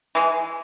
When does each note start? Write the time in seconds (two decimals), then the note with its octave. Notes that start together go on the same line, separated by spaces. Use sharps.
0.15 E3 G#3